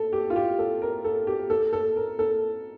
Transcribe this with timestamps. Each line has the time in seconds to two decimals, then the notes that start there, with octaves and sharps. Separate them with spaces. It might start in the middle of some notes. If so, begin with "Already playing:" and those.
Already playing: A4
0.13 G4
0.30 F4
0.36 G4
0.59 A4
0.82 A#4
1.04 A4
1.27 G4
1.50 A4
1.73 A4
1.96 A#4
2.19 A4